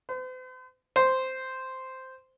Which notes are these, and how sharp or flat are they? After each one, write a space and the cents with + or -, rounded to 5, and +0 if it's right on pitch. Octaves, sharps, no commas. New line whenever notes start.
C5 -45
C5 -5